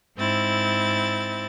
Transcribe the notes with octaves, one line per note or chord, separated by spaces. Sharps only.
G#2 C4 E4 A6